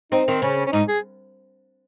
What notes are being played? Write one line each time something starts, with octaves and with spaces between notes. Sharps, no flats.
C4 D#4
D#3 C4
C#3 C#4
C#4
G#2 D#4
G#4